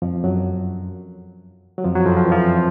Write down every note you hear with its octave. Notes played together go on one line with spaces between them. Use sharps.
F2 F3
F#2 F#3
F#3
F2 F3
F#2 F#3
F2 F3
F3
E3
F2 F3